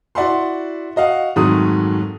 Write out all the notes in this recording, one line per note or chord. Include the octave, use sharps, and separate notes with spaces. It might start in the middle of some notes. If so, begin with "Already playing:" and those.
E4 F#4 D5 E5 F#5 C6
F#4 D#5 F5 F#5
F2 G#2 D#3 F#3 A3 D#6